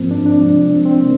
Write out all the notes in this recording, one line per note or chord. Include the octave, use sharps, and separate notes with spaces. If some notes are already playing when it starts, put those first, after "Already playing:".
Already playing: G#2 F3 A#3 C4
D4
D4
C3 F3 G#3
C4
C4
C3 D#3 A#3